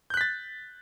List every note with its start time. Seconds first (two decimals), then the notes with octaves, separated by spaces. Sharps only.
0.10 G6
0.14 F#6
0.17 B6
0.21 A6